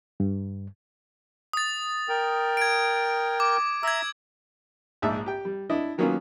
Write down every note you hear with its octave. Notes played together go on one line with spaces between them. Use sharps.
G2
D#6 A6
A#4 G5
G#6 D7
D6
E5 A#5 E6 G#6
A#1 G#2 D#4 E5 A5
G4 G5
G3
D4 E4 D#5
D#3 F#3 A#3 B3 C#4 F4